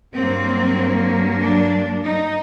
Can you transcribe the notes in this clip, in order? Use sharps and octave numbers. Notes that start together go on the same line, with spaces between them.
G2 F#3 A#3 C4
D4
D#4